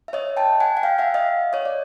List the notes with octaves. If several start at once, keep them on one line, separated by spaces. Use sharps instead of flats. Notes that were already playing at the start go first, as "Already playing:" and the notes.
E5
C#5 D#5
G5 A5
F#5 G#5
F#5
F5 G5
E5 F#5
D#5 F5
C#5 D#5
D5